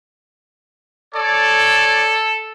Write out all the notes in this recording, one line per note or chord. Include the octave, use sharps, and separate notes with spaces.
A4 C#5 D5